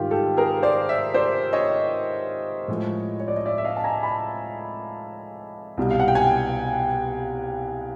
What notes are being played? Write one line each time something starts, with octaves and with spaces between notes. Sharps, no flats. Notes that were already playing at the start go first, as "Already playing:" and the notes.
Already playing: G#2 D#3 G3 F4 G4
G4 A4
G#4 A#4
C5 D5
D5 E5
C5 D5
C#5 D#5
A2 F3 G#3
C#5
D5
D#5
D5 E5
E5
D#5 F5
A5
G#5 A#5
A5 B5
C2 B2 G3
F5
F#5
G5
F#5 G#5